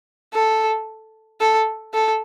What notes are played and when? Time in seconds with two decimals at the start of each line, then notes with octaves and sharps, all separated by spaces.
0.34 A4
1.41 A4
1.94 A4